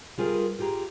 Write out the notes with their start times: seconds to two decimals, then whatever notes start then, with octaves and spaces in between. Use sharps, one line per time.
0.18 G3 F4 G#4 A#4 B4
0.59 F4 G4 G#4 A#5